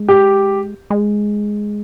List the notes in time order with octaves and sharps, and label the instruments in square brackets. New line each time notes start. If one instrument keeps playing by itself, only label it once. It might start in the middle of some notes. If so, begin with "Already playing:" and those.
Already playing: [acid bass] G#3
[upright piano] G4
[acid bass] G#3